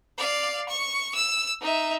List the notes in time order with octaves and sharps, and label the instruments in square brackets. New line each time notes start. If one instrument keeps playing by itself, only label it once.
[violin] D5 F5
C#6
E6
D#4 E5